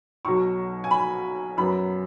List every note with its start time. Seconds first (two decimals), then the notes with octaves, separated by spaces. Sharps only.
0.25 B1 B2 F#3 C#6
0.84 G#5
0.91 B5
1.57 F#2 F#3 B3 B5